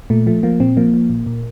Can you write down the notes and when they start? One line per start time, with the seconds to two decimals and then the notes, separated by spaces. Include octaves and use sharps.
0.10 A#2 A3
0.26 F3 A3
0.43 F3 A#3
0.60 A#2 C4
0.77 F3 A#3
0.94 F3
1.10 A#2
1.26 A#2